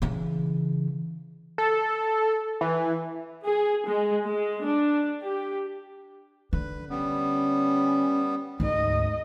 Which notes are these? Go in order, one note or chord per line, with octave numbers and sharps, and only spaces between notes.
C#3 E3
A4
E3
G#4
G#3
G#3
D4
G4
D3 B4
G3 B3 C#4
D2 G#2 D#4 D#5